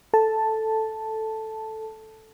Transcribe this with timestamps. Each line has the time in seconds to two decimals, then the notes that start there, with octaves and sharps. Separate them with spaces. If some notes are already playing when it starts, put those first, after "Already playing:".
0.14 A4 A5